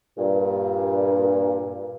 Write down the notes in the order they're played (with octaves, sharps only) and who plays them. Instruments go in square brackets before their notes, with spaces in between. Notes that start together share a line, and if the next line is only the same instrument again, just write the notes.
[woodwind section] G2 A#2